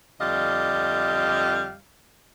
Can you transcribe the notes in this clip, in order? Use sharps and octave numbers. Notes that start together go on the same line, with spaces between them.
F2 D3 G3 D#5 F5